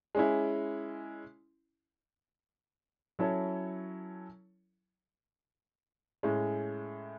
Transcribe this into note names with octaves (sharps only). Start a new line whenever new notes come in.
G#3 C#4 E4
F#3 C#4 E4 A4 C#5
A2 G#3 C#4